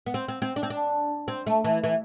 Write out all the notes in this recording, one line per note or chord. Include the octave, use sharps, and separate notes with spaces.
B3
C4
C4
C4
D4
C4
D4
C4
A3
E3
E3